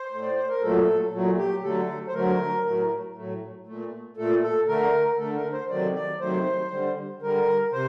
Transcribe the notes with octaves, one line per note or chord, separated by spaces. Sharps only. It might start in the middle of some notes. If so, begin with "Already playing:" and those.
Already playing: C5
A2 A3
D5
C5
A#4
A#2 F#3 A3 A4
A#2 F#3 A3
G4
D3 F#3 A3 A4
C5
D3 F#3 A3 A#4
A2 F#3 A3
A2 F#3 A3
A#2 A3
A#2 A3 A4
A4
D3 A3 A#4
D3 A3 A4
A#4
C5
C3 D#3 F#3 A3 D5
D5
C3 D#3 F#3 A3 C5
D3 G3
D3 G3 A#4
C3 C5